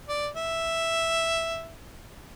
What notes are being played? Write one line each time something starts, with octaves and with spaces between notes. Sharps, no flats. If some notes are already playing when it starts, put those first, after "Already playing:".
D5
E5